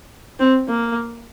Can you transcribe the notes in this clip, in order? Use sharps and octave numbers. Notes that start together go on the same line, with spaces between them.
C4
A#3